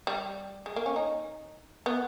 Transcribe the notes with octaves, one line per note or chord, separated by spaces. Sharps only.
G3
G#3
A#3
C#4
D#4
B3